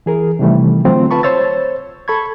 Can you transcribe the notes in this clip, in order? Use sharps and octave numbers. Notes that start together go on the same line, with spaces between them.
E3 G#4 A#4
C3 D#3 E3 G3 A3
D3 F#3 A3 C4 F4
F4 B4 A5 B5 C#6
C5 C#5 E6 A6
A4 B5 C#6 G#6